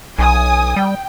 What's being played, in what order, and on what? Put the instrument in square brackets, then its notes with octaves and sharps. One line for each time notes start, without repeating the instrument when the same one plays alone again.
[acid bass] B1 [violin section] G#5 D#6
[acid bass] G3 [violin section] G5